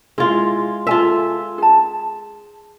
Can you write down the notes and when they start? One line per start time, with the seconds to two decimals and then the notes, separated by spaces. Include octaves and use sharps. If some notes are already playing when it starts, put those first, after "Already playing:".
0.18 G#3 E4 F4
0.87 F4 A4 E5 G#5
1.58 G#4 A5